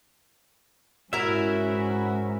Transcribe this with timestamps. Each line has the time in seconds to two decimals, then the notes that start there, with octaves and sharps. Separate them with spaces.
1.13 G#2 C#4 E4 F#4 A#4 E5